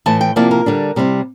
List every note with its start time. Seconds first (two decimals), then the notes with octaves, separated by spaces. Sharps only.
0.06 A2 E3 A3 A5
0.21 G5
0.36 C3 F3 A#3 E4 D5
0.51 A#4
0.66 D3 G3 D4
0.96 C3 G3 C4 E4